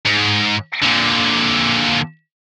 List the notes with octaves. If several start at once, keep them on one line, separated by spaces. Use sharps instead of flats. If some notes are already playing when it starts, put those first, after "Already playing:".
G#2
A#2 D3